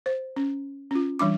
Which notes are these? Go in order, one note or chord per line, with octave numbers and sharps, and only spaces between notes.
C5
C#4
C#4 F4
E3 G3 D4 D6